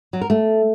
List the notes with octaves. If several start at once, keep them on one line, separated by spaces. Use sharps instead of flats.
F#3
A#4
A3